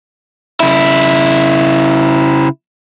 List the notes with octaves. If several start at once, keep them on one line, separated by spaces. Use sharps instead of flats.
C#3 E4